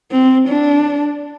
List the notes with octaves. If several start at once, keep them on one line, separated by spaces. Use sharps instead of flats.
C4
D4